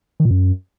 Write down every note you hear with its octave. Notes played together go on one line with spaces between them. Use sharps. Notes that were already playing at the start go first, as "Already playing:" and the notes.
D#3
A#2
F#2